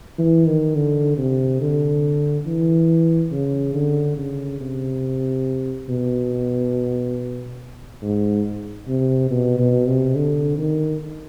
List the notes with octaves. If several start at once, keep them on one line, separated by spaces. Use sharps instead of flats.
E3
D#3
D3
C3
D3
E3
C#3
D3
C#3
C3
B2
G#2
C3
B2
B2
C3
D3
D#3